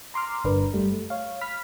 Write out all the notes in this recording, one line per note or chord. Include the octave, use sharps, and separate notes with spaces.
A#5 C6 D6 F6
G1 G2 D3 D4 A#4 B4
F#2 G3 A3
A3
C#5 F5
B5 F6 B6